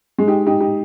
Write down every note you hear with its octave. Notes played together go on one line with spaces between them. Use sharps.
G#3
D#4 G4
D#4 G4
D#4 G4